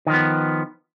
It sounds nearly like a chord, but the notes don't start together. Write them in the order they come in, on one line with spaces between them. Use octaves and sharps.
D#3 F3 B3